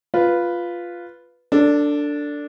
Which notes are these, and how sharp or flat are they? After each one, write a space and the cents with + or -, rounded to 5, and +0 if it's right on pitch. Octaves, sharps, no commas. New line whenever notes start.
F4 +0 B4 +0
D4 -5 A4 +30